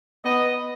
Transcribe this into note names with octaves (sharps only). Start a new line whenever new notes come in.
B3 D#5